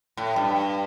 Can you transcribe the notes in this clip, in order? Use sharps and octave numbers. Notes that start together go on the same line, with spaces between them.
A2
G2